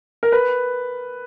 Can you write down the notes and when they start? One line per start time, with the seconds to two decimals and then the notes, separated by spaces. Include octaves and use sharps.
0.23 A#4
0.32 B4